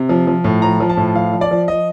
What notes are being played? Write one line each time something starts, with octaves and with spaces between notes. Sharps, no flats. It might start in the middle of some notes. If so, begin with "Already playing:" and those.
Already playing: C3
F3
F3
A2
F3 A#5
F3
A5
A2
F3 F5
F3
D5
F3
F3 D#5